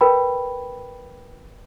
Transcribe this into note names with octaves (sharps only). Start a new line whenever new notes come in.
A#4 B4 G5 B5